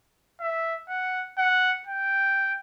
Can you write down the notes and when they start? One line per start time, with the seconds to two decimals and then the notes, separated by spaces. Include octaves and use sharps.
0.41 E5
0.89 F#5
1.38 F#5
1.87 G5